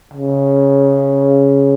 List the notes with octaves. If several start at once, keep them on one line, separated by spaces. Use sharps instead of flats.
C#3